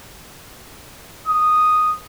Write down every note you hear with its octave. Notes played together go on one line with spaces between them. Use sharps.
D#6